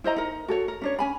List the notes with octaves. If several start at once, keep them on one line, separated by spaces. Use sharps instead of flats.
E4 C5 D#5 A#5
D#4 A#4
F#4 A4 C#5
A#4
C#4 D4 C#5
C#4 G#5 B5